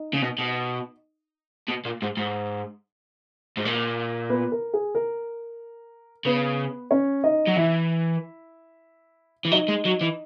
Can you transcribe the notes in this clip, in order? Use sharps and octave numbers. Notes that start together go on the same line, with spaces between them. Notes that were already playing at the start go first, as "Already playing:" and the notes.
Already playing: D#4 D#5
C#3
B2
B2
B2
A#2
G#2
G#2
G#2
A#2
B3 B4
A#4
G#4
A#4
C#3 B3 B4
C#4 C#5
D#4 D#5
F#3
E3 E4 E5
E3
F#3 D#4 D#5
G#3
F#3
E3